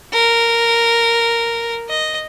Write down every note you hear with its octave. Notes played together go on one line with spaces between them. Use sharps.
A#4
D#5